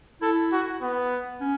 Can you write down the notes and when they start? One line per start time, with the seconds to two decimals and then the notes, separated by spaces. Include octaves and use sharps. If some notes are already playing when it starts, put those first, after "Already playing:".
0.22 E4 A4
0.52 F#4
0.81 B3
1.41 C#4